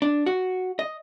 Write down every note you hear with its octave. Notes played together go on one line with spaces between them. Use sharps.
D4
F#4
D#5